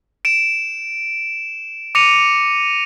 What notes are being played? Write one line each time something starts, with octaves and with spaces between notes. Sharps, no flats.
D7 E7
D6 A#6 C#7 D#7 F7